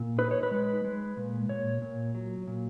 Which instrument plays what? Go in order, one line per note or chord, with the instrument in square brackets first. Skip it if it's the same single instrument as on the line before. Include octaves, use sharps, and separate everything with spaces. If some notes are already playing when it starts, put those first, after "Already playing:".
Already playing: [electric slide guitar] A#2
D#4 B4
C#5
B4
G#3
G#3
A#2
A#2 C#5
A#2
F#3
A#2